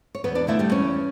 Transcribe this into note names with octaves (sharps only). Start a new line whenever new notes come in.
C#5
E2 B3 B4
D4 D5
D3 A3 E4 E5
G3 G4
E2 C#4 C#5